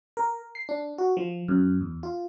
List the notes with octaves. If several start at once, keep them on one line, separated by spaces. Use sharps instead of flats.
A#4
C7
D4
F#4
F3
F#2
E2
F4